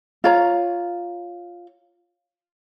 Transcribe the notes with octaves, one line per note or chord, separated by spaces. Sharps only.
F4 C#5 A#5